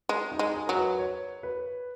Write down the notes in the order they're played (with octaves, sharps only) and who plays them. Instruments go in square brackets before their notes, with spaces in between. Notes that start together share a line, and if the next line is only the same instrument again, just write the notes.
[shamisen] G#3
[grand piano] D#4
[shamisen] G#3
[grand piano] G#4
[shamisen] F#3 [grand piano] A#4
[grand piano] B4
C#5
B4